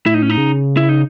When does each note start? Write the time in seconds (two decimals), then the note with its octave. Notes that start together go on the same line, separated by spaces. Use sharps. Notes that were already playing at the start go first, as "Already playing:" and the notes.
0.06 A2 E4
0.14 D#4
0.22 C#4
0.30 D#4
0.38 C#3
0.77 E4
0.89 D#4